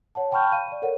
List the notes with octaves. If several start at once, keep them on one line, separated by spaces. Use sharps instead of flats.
C#5 F#5 A5
G5 A5 B5 C#6 F6 G6
F5 D#7
D5 F5
A4 A#4 C#5 F#5